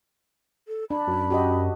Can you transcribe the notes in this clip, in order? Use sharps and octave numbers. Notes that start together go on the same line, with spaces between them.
A4
D4 B5
F#2
F#4 G4 D#5